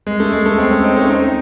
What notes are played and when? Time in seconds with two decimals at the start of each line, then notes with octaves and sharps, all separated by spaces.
0.07 G#3
0.20 A3
0.32 G#3
0.46 A3
0.58 G#3 C4
0.71 A3 C#4
0.83 C4 D#4
0.96 A3 C#4
1.09 C4 D#4